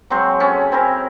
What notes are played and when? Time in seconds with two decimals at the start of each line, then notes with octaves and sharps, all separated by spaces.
0.10 F#3 G#3 C4 C5
0.40 C#4 G#4 A4
0.72 C4 E4 A#4